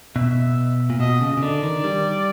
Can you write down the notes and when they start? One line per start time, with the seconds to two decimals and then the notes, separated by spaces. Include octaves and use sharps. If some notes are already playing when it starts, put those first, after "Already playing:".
0.16 B2 E5
0.90 A#2
1.00 B2 D#5
1.21 C#3
1.37 C#3
1.42 D3 D5
1.63 D#3
1.84 G3